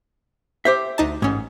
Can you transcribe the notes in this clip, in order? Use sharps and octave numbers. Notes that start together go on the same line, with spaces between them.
G4 C5 E5
D2 D#4 A5
A1 G#2 C#4